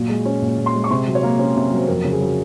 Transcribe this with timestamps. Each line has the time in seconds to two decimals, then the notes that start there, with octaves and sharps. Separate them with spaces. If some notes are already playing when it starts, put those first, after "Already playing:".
Already playing: A#2 F#3 C#6
0.09 G#3
0.25 C#4
0.42 A#2
0.58 A#2
0.66 C6
0.74 G#3
0.84 C#6
0.90 C3 C6
1.07 F#3
1.15 C#5
1.23 A#3
1.39 C#4
1.56 C3
1.71 F#3
1.77 C5
1.88 F2 A#4
2.04 C#3
2.13 G#4
2.21 F#3